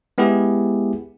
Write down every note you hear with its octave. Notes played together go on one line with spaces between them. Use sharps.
G#3 B3 E4 G4 G#4